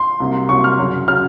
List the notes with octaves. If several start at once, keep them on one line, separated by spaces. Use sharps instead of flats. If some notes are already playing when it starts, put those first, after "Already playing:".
Already playing: C6
C2 C3 F#3 A#3
C2 C3 F#3 A#3 C#6
F6
F#2 C#3 F#3
C#3 F#3 F6